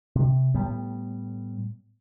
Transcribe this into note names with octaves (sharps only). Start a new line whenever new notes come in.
C3
A2 G3 B3